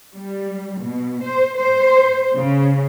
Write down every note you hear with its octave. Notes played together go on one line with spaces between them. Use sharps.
G3
B2
C5
C5
C#3